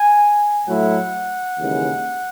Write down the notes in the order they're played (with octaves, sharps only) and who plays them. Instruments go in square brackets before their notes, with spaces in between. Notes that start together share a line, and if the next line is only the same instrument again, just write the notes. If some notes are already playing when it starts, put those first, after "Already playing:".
Already playing: [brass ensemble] G#5
A2 F#3 A3 E4 F#5
D#2 C#3 E3 G#3